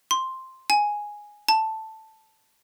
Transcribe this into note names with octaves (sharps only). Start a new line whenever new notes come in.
C6
G#5
A5